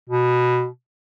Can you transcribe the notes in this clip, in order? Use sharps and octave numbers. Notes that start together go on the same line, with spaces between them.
B2